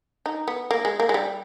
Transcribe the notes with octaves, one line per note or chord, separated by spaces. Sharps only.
D#4
B3
A#3
G#3
A#3
G#3
G3